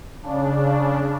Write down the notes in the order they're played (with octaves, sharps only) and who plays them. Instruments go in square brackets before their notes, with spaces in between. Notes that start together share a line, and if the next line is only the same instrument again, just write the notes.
[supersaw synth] C#3 D4